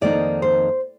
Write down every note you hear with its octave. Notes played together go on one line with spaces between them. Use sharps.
F2 D#3 A#3 D#4 D5
C5